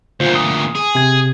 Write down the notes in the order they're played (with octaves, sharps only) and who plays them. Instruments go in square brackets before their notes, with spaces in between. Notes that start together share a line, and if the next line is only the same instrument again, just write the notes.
[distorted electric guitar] D2 A#2 [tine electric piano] F4 C5
[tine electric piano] D#6
[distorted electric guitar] G#4
[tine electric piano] C3 G#6